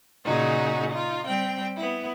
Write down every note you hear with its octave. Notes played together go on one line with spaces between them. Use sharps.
A#2 C#3 D#4 F#4 G#4
D#4 F4
G3 C4 G5
B3 E4